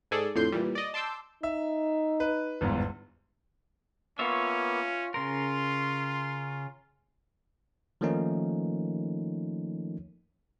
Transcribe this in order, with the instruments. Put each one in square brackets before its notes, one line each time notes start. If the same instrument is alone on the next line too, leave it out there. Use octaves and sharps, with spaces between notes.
[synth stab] G#2 G#4 A4 D5
F2 A2 D3 C6 G6
A#2 E3 G3
D5 D#5
A5 C6 D6 E6 G6
[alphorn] D#4 [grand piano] E5
[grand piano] B4
G1 E2 G#2
[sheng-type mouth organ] A#3 B3 [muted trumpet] C#4 [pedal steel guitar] F4 C#5 E5
[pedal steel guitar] C#3 A#4 [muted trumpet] F4 [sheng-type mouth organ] C6
[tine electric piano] D#3 F3 A3 A#3 C#4 D#4